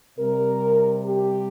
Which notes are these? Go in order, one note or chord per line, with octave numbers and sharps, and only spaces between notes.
C3 G3 A#4
G4